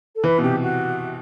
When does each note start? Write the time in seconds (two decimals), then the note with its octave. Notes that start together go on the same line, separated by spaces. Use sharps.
0.15 A4
0.24 E3 B4
0.38 B2
0.42 C3 G4
0.62 F#4